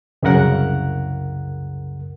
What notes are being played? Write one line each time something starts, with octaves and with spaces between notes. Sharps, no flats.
C2 F#2 C#3 A#4 F#5 F#6